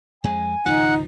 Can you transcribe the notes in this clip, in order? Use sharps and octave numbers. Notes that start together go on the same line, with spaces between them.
F2 G#3 G#5
G#1 C#2 F3 D#4 F#5